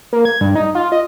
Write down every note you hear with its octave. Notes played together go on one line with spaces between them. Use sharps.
A#3
G#6
G2
D#4
F4
D#5